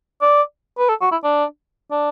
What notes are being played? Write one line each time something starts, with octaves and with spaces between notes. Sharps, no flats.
D5
B4
A4
F#4
E4
D4
D4